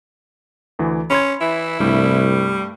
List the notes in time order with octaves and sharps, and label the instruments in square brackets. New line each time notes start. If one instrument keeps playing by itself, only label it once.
[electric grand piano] D2 E3
[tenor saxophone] C#4 [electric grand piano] B5 C6 G#6
[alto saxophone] E3 [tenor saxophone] E4
[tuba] C2 [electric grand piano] G2 A3 [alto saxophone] G3